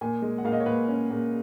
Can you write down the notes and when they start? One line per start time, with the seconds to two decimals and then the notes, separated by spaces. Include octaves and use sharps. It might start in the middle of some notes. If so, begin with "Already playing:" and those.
0.01 A#2 G#5
0.22 G#3
0.38 F#5
0.45 A#2 F5
0.52 D#5
0.60 C#5
0.66 A#2 B4
0.88 C#4
1.11 A#2